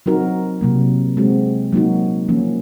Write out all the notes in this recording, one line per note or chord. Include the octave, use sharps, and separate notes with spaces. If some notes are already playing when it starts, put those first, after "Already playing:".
F#3 C4 D#4 F#4 A#4
C3 F#3 A#3
G#3 C4 F#4
F#3 A#3 D#4 F#4
F3 A#3 C#4